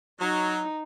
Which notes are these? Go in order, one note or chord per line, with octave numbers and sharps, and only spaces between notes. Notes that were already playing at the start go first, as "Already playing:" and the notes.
F#3 D#4